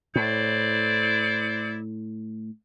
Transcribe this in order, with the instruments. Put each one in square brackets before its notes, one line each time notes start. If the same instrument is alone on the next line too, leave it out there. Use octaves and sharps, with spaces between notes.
[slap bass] A2 [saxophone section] E4 C5 D5